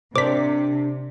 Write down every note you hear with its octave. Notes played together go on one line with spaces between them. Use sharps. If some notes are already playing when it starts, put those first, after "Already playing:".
C3 D4 A#4 C5 D5 D6 B6